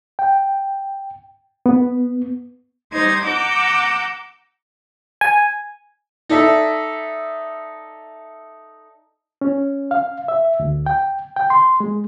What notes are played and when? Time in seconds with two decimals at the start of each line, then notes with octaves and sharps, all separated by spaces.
0.19 G5
1.66 B3
2.93 G3 D#4 C5 G#6
3.25 F#5 A#5 D6 E6 G6
5.21 G#5
6.29 D#4 A4 D5 E5
9.41 C#4
9.91 F5
10.28 E5
10.60 D2
10.86 G5
11.36 G5
11.50 C6
11.80 G#3